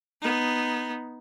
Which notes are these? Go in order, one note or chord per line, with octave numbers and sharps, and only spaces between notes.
B3 D#4